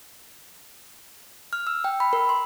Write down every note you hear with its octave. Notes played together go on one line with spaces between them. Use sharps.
F6
E6
G5
B5
A#4
C6